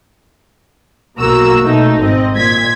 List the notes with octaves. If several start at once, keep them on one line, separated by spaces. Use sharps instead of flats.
B1 A#3 F#4 A#5 E6
B2 A3 D#4
G#1 C4 D#5
A#2 G#6 B6